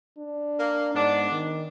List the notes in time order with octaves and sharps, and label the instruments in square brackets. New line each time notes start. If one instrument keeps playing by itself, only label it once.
[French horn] D4
[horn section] A#3
[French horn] G#2 [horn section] B3 D4
[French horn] D#3